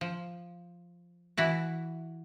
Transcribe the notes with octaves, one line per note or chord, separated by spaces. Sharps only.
F3
E3 E4 F#4